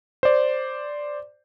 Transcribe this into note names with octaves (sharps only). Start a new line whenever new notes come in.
C5 D5